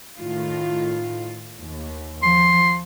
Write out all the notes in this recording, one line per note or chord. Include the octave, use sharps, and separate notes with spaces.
A2 D#3 F4
D#2
F3 C6